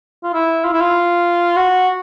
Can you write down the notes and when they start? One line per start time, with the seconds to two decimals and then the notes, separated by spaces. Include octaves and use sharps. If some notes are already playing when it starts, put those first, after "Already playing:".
0.23 F4
0.34 E4
0.65 F4
0.73 E4
0.81 F4
1.56 F#4